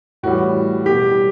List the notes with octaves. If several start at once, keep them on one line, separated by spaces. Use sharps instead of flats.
A2 E3 G3 F#4
B2 G3 G4